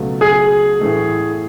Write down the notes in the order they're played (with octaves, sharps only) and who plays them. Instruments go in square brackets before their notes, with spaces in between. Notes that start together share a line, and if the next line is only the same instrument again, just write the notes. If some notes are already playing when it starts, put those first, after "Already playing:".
Already playing: [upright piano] C#2 B2 F#3 A3
[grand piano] G#4
[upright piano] A2 E3 A3